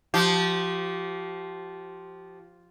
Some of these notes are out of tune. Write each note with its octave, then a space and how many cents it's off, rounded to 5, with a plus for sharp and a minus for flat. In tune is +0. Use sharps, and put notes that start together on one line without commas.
F3 +0 G4 -25